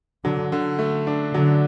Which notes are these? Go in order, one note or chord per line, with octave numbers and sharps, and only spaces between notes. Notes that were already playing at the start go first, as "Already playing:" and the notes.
D3 F#3
D3
A3
D4
D3 F#3